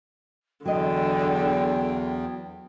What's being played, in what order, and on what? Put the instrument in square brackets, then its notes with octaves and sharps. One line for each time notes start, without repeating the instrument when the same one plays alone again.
[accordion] E2 [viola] D3 [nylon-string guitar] F#3 D#5 [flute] G5